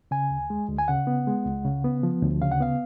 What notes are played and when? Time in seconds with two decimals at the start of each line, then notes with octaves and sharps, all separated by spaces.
0.11 C#3 G#5
0.31 D2
0.50 G#3
0.69 D2
0.78 G#5
0.88 C#3 F#5
1.07 B3
1.27 G#3
1.46 C#2
1.65 C#3
1.84 B3
2.03 F3
2.22 D2
2.42 C#3 F5
2.51 F#5
2.60 B3 F5